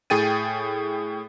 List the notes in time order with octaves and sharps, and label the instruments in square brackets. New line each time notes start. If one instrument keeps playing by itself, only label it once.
[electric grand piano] A2 G#4 G5 A6 D#7